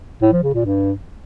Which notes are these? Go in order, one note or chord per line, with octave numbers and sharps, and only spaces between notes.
A2
F3
C#3
A#2
G2